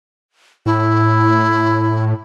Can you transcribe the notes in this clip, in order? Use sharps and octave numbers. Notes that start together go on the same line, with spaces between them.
A2 E4